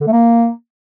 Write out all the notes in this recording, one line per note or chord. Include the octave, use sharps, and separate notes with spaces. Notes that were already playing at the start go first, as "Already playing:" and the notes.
D3
A3
A#3